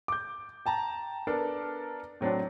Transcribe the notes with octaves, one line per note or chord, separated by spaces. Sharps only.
D6 G6
G5 A5 A#5
B3 D4 A4 A#4
A2 F#3 C4 D4